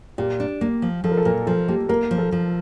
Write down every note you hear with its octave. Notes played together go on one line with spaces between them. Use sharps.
A#2 G4
D4
A#3
F3
F3 A4
A#4
A4
A#2 A#4
F3 A4
A#3 G4
A#3 A#4
F3
A4
F3